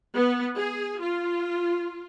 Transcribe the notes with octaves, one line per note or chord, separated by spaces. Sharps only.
B3
G#4
F4